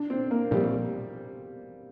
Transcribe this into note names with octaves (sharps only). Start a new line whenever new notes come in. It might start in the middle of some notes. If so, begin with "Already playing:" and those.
Already playing: D4
C4
A#3
A#2 F3 G3 C4